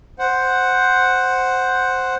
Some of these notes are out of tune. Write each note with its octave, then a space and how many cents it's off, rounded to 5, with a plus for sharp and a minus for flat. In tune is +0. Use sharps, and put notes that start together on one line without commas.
C5 +0 F#5 +0